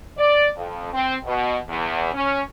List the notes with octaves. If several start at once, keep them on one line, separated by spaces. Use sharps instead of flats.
D5
F2
C4
B2
E2
C#4